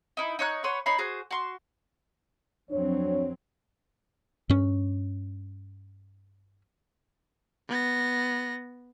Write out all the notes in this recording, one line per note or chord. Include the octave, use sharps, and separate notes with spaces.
D#4 E4
D#4 C#5 C#6 F#6
B4 C#5 F#5 C6
D#4 C#5 B5 C6
F#4 G#4 C5
F#4 C6
F2 F#3 C4 D4 C#5
G2 C#4
B3 A#6